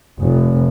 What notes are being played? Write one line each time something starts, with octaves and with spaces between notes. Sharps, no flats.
F1